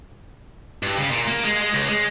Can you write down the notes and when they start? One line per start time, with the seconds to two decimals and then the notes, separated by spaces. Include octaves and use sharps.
0.83 G2
0.97 C#3
1.11 A#2
1.27 A#3
1.45 G#3
1.61 G#3
1.74 C#2
1.88 G#3